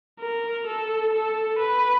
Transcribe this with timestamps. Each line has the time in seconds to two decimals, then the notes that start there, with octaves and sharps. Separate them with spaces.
0.20 A#4
0.67 A4
1.13 A4
1.59 B4